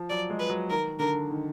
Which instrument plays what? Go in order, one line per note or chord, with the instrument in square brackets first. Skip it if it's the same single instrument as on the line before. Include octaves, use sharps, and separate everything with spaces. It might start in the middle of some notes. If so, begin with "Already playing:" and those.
Already playing: [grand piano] F3
[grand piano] F#3 [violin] D5
[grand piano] G#3
[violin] B4
[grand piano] F#3
[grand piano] D#3 [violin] A#4
[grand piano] D3 [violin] A#4
[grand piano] D#3